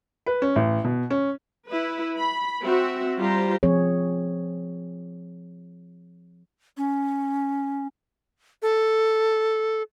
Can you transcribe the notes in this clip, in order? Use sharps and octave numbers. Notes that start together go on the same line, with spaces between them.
B4
C#4
A1
B2
C#4
E4 B4
B5
C4 F#4 E5
G3 F4 G4 C5 A#5
F3 C4 G#4 C#5
C#4
A4